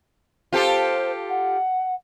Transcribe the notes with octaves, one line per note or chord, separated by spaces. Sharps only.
F4 G4 A4 C5
F#5